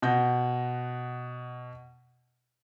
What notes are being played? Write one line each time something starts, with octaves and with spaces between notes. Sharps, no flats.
B2 F#5 G6 A#6